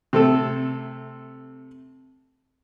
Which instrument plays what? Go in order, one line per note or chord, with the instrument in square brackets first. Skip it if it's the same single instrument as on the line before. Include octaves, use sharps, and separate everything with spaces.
[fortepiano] C3 A3 A4